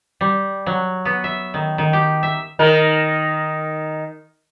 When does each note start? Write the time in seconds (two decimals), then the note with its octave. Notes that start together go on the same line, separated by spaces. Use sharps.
0.21 G3
0.66 F#3
1.05 B3
1.24 E5
1.54 D#3
1.78 D#3
1.93 G4
2.23 E5
2.59 D#3 A#4